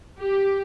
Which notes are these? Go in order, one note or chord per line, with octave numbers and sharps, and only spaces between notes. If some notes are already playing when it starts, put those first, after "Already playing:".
G4